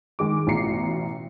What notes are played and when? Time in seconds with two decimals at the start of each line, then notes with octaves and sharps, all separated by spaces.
0.19 D#3 G#3 D6
0.47 A1 B2 F4 A#5 C7 C#7